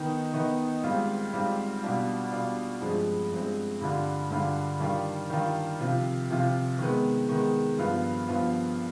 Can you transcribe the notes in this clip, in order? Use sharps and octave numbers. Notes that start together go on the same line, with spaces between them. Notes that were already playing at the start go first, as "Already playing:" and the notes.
Already playing: D#3 B3 D#4
D#3 B3 D#4
G#2 G3 C4 F4
G#2 G3 C4 F4
B2 G3 D4 F4
B2 G3 D4 F4
G2 F3 G#3 C4
G2 F3 G#3 C4
G2 D3 G3 D4 F4
G2 D3 G3 D4 F4
D#3 G3 D4 F4
D#3 G3 D4 F4
C3 F3 C4 F4
C3 F3 C4 F4
D#3 G#3 B3
D#3 G#3 B3
G2 F3 B3 F4
G2 F3 B3 F4